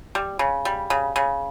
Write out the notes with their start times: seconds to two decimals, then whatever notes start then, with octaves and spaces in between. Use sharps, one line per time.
0.15 G3
0.39 C#3
0.65 G3
0.90 C#3
1.16 C#3